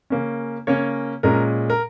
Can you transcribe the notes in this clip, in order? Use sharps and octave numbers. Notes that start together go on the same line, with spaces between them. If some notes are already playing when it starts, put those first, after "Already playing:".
C#3 A#3 C#4
C#3 A#3 C#4 C#5
A#2 G#3 C#4 A#4
A#4